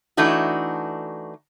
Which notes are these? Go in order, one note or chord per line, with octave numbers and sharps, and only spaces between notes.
E3 A3 D4 D#4 F#4